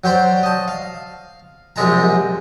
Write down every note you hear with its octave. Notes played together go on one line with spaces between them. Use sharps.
F#3 G4 C5 D5
D#5 A5
F5
A#1 F#2 C3 G#3 A5 A#5